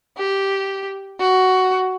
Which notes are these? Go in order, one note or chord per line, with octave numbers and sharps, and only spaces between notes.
G4
F#4